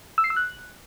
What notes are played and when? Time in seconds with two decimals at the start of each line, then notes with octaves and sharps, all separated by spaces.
0.18 E6
0.24 C7
0.30 E6
0.36 F#6